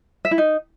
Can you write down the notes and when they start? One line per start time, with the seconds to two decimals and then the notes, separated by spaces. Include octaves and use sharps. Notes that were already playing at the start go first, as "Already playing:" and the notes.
0.25 E5
0.31 E4
0.38 D#4